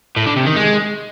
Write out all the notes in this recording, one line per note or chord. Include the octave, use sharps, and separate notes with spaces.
A2
D3
C3
D#3
G#3